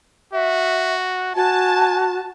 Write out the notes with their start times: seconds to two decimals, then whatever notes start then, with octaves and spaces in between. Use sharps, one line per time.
0.33 F#4 E5
1.36 F#4 G#5 A5